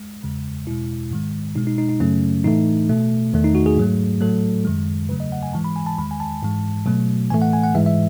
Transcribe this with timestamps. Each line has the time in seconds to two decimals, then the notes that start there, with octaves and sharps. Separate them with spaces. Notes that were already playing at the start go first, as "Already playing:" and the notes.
Already playing: G#3
0.23 E2 C#3 G#3
0.67 E2 B2 G#3 E4
1.11 G#2 D#3 G#3
1.55 B2 G#3 D#4
1.67 D#4
1.78 D#4
1.89 D#4
2.00 F#2 C#3 F#3 A3 C#4
2.44 A2 E3 A3 D#4
2.89 B2 A3
3.33 E2 D#3 A3
3.44 D#4
3.55 F#4
3.66 G#4
3.77 G#2 F#3 A3
4.21 A2 F#3 A3 A4
4.65 F#2 D#3 G#3
5.09 E2 C#3 F#3 A3 B4
5.20 D#5
5.32 F#5
5.43 G#5
5.53 G#2 E3 G#3 A5
5.64 B5
5.76 G#5
5.86 A5
5.98 E2 D#3 G#3 B5
6.11 G#5
6.20 A5
6.42 G#2 E3 G#3
6.86 B2 F#3 A3
7.30 A2 E3 A3 G#5
7.42 F#5
7.53 G#5
7.64 F#5
7.75 G#2 E3 G#3 E5
7.86 E5